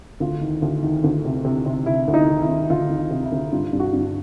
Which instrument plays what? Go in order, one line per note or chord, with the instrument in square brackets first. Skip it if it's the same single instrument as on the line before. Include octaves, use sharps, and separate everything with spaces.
[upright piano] D2 F4
D#3
D2
D#3
D2
C3
C3
C3
C3 E4
D2
D#4
D#3
E4
D#3
D2 F4
D#3
F4
C3
E4
D2
G2 F4
G2
F#4
G2